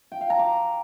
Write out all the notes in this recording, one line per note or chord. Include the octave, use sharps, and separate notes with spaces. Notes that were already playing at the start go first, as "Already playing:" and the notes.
G5
F5
A#5
D6